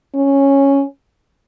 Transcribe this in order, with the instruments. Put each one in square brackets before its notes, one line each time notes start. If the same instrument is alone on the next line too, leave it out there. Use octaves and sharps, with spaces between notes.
[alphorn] C#4